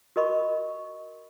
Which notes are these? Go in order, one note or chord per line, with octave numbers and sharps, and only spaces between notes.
F#4 A#4 D#5 B5 C#6